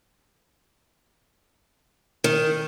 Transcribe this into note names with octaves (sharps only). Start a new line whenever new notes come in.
D#3